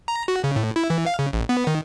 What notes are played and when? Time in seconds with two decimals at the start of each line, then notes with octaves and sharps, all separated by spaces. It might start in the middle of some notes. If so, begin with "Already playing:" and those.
0.08 A#5
0.28 F#4
0.44 C#3
0.56 A2
0.76 E4
0.90 E3
1.06 F5
1.19 C#3
1.33 A1
1.49 B3
1.67 D#3